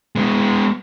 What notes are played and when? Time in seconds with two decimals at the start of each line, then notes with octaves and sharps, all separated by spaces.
0.16 G#3 B3